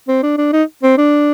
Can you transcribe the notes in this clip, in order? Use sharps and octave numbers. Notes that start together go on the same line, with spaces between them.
C4
D4
D4
D#4
C4
D4